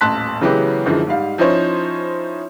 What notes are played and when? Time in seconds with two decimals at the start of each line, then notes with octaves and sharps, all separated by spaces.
0.01 D#1 A1 A5 C6 F#6 B6
0.41 C#3 E3 F#3 G#3 B3 G4
0.86 F#2 D3 E3 F3 G#3
1.07 G#2 G3 F5
1.38 F3 C#4 D#4 E4 C5 C#5